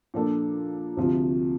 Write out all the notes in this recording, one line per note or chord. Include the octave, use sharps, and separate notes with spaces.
A#2 F3 A#3 D4 A4
D2 C3 F3